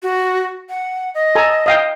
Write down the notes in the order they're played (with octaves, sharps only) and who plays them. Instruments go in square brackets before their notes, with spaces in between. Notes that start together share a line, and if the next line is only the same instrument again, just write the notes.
[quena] F#4
F#5
D#5
[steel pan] A4 G#5 A#5
D#5 F5 G5